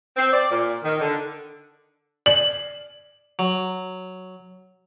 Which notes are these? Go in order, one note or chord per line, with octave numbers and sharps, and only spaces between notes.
C4
D5
A#2
D#3
D3
D5 F#7
F#3